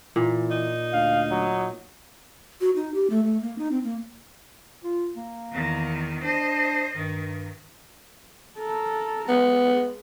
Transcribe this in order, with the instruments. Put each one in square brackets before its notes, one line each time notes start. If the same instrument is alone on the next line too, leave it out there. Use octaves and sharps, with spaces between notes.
[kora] A#2 [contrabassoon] E3
[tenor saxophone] D#4
[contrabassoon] D2 [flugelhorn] F5
[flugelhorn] F#3
[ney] F#4
D#4
G4
A3
A3
A#3
D#4
C4
A#3
[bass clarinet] F4
A#3
[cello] E2 D#3
[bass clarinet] D4 [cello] C5 D#5
[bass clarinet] G2 [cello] D#3
[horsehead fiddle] A4 A#4
[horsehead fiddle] G#3 [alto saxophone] B3